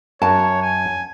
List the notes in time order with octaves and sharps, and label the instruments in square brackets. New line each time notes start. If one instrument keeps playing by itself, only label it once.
[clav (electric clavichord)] F#2 F#4 [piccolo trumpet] C#5 [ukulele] A5
[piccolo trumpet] G#5